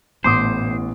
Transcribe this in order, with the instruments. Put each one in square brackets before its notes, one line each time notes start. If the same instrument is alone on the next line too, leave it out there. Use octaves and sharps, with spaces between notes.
[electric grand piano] A1 B3 [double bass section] A2 [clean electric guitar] C5 [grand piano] C6 D6 D#6